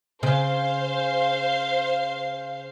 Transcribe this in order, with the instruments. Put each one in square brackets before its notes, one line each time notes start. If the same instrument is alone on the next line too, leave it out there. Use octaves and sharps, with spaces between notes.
[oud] C#3 [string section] C5 F5